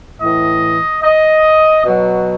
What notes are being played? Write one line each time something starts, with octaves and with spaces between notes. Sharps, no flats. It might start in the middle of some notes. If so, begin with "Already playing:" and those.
A2 E3 D#5
D#5
B2 F#3